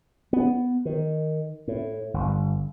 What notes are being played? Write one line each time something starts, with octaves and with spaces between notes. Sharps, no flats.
B3
D#3
A2
G1